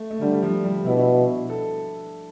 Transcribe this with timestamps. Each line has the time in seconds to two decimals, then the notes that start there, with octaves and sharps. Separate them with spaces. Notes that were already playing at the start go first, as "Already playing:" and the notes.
Already playing: A3
0.11 A3
0.21 D3 G3
0.33 G3
0.42 F3
0.64 G3
0.85 B2 E4
0.94 D4
1.01 E4
1.49 A4